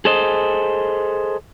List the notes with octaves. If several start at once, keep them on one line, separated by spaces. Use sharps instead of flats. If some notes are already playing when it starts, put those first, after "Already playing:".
G#4 A4 C5 D#5